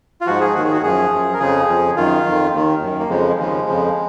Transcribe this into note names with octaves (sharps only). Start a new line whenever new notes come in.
F4
G#2 F3 F#4
G#4
D#2 D#3 F#4
G#4
F#4
F#2 F3 G#4
F#2 F3
A#4
F2 C#3 F3 G#4
F2 F3
F#2 D#3 F4
F2 D#3
D#2 D#3
F#2 D#3
A#3
F2 C#3 F3 G#3
D#2 C#3 F3 G#3
F2 C#3 F3